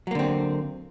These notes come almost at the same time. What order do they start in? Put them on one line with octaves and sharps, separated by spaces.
F#3 A#3 D3 C4